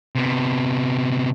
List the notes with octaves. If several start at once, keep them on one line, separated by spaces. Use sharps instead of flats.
C3 B3